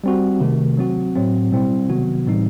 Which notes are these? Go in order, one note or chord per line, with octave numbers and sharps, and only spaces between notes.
G3 C4 F#4
C3 D#3 A3
F#3 C4 F#4
A2 F#3 C4
B2 G3 C4 E4
C3 D#3 F#3 B3 F#4
A2 E3 G3 C4 D#4